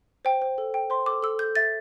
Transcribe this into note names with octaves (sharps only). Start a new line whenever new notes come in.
C5 G5
C5
A4
G5
C5 C6
A4 D6
A4 E6
A4 G6
E5 A6